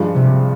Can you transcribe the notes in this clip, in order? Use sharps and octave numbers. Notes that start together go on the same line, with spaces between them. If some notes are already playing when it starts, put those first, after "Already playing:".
Already playing: G2 F3 G#3
C3